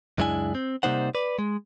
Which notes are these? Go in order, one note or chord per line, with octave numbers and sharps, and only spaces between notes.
C#2 F#2 G#3 D4 E4 G#5
C4
C3 G3 A#3 D#4 C5 F#5
B4 D5
G#3